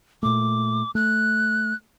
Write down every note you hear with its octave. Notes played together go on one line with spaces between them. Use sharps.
A#2 A3 D6
A3 F#6